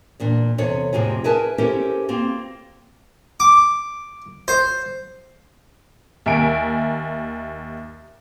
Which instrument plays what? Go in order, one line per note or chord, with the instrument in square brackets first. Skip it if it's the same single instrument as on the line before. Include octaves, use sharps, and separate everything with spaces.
[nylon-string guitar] E2 A#2 D4
E2 C3 A4 C#5
F2 A2 C3 C4 F4 G#4
G#4 A#4 B4 E5 G#5 A5
C#4 E4 G4 A4 A#4 C5
A#3 C4 F4
[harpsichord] D6
C5
[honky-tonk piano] D#2 E5 G#5 A#5 D7